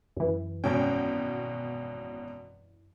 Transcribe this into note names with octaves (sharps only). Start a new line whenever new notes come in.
F#2 E3
G#1 B2 C#4 G5